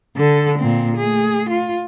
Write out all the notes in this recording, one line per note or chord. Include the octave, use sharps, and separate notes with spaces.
D3 A4
A#2 C4
A3 G#4
F4